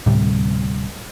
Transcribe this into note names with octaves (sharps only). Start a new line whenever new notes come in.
D2 A2 C3 G3